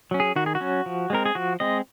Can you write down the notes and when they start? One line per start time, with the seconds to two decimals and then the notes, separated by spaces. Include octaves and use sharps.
0.11 F#3 C#4
0.20 G#4
0.36 D#3 F#4
0.46 G#4
0.55 F#4
0.60 F#3 C#4
0.86 F3
1.10 G#3 C4 A#4
1.26 G#4
1.35 F3 F#4
1.60 G#3 C4 D#5